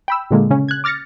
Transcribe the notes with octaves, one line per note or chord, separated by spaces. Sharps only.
G5 B5 E6
A#2 D3 G#3 A#3
C#3 C#4
F#6 G#6
D6 F6 A6 A#6 C#7